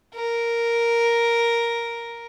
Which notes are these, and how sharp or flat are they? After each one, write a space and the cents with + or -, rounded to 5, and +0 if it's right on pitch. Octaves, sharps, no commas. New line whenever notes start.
A#4 +0